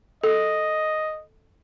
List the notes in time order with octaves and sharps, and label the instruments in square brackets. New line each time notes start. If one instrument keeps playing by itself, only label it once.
[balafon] A4 [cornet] D#5